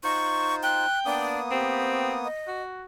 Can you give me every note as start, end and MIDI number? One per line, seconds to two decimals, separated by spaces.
0.04 0.86 63
0.04 0.86 65
0.04 0.86 72
0.04 0.55 85
0.63 1.26 79
0.63 0.99 90
1.05 2.28 58
1.05 2.28 59
1.05 1.40 62
1.05 2.28 87
1.51 2.20 60
1.51 2.14 67
2.25 2.62 75
2.47 2.85 66